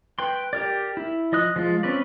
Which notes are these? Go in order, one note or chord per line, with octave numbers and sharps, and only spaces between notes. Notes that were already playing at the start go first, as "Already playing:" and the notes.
B4 G5 C6
G4 A#4 D5
E4
F3 D#5 D#6 F#6
F3 G#3 F4
C4 C#4 B4 D5